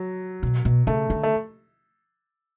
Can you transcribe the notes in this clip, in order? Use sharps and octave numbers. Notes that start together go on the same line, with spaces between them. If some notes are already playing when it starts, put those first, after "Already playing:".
Already playing: F#3
B2
B2
C#3 A3
D3
A3